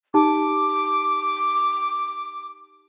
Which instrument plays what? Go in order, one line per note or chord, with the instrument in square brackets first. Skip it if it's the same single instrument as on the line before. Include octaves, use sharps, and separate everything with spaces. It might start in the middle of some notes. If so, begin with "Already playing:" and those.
[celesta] D#4 G4 A5 [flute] D6